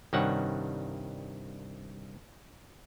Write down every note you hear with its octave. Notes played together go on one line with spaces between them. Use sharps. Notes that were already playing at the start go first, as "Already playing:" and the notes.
C2 G2 D#3 G3 C#5 F#5